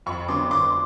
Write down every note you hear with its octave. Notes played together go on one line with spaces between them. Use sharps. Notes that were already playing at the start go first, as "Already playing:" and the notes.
F2 B5 C#6
D3 F#3 B3 C6 D6
F2 C6 D6